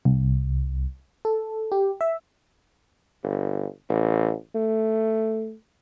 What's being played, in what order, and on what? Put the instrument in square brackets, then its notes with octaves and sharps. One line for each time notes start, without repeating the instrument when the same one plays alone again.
[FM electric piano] C2
A4
G4
E5
[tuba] G1
A1
A3